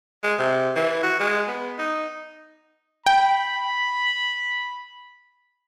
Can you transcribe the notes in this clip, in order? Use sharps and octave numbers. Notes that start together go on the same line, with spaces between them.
G#3
C3
E3
F#4
G#3
B3
D#4
G5 B5